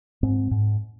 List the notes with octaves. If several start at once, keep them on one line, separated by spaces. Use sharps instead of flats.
G#2 C4
G#2